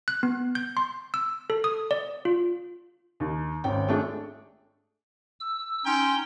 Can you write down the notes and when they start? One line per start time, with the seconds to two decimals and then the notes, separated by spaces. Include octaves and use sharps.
0.08 F#6
0.23 B3
0.55 G6
0.77 C6
1.14 E6
1.50 A4
1.64 D#6
1.91 D5
2.25 F4
3.20 D#2
3.64 G#1 C#4 G5
3.88 A3 D4 G#4
5.40 E6
5.86 C#4 D#4 G5 C6